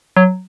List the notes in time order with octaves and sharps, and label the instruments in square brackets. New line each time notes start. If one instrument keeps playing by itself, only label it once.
[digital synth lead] F#3